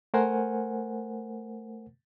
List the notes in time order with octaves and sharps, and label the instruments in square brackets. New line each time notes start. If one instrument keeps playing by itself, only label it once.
[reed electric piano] A3 A#4 C5 F#5 G#5